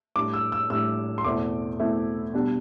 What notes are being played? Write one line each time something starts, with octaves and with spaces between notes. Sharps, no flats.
A2 G3 D4 D6
E6
E6
A2 G3 D4 E6
C6
E2 B2 A3 C4 E4 D6
E2 B2 A3 C4 E4
B2 G3 D4